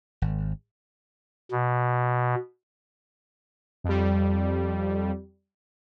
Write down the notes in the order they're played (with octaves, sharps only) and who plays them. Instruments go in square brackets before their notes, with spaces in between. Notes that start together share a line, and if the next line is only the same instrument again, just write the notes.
[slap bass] G#1
[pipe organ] B2
[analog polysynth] F2 G3